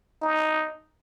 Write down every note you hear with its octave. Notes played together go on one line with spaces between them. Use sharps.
D#4